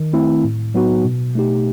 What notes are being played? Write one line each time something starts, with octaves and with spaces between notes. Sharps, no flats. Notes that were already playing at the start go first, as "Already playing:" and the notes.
Already playing: D#3
A3 C4 E4
A2
F#3 B3 D#4 F#4
B2
A3 D#4 G4